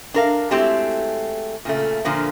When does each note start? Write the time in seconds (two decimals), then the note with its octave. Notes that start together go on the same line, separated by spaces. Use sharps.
0.14 D4 A#4 F5
0.51 G#3 A3 C4 E4 F#4 G4
1.65 A#2 C#3 A3
2.05 A#2 D3 F3 A#3